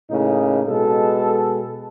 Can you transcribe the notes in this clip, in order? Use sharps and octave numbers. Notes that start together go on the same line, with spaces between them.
A2 C#3 A#3 D#4
B2 G#3 A4